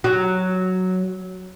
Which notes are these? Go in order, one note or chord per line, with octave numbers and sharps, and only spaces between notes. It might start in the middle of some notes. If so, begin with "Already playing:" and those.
F#3